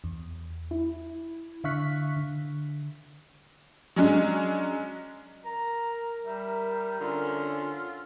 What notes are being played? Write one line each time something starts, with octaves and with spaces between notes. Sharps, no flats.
E2
E4
D3 E5 F5 C#6 F#6 B6
D3
F#3 G#3 C#4 D4
A#4 A#5
G3 E5
D3 C#4 F4